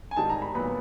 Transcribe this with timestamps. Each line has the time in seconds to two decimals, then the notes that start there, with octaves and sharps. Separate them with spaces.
0.11 G#5
0.16 G#2 D#3 G3 A5
0.30 A#5
0.42 B5
0.54 A#2 F#3 B3 B5